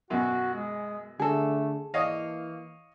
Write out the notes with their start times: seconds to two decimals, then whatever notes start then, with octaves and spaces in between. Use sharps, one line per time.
0.10 F#2 B2 F#4
0.54 G#3
1.20 D3 A3 G#4 A4
1.94 E3 A#3 C#5 D#5 F5